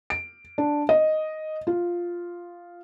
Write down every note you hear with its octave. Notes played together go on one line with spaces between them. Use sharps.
D7
D4
D#5
F4